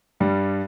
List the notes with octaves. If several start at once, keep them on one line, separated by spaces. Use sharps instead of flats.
G2 G3